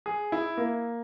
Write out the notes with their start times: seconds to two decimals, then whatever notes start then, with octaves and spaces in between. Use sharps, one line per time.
0.06 G#4
0.32 E4
0.57 A#3